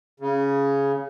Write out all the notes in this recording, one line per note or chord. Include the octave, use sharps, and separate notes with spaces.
C#3